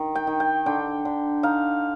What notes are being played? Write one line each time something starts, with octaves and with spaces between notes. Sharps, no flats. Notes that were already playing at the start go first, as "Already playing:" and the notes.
Already playing: D#3
G5
D#3
G5
D3 G5
D3
D#4 F5